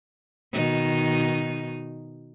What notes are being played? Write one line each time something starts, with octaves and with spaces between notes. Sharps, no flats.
B2 D#3 D#4